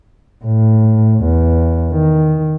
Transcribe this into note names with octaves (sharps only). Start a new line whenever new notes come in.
A2
E2
D#3